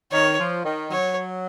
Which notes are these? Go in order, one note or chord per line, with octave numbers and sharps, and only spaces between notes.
D#3 C#5
F3
D#3
F#3 C#5